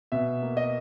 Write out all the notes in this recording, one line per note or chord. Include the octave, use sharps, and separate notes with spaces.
B2 E5
A#3
D#5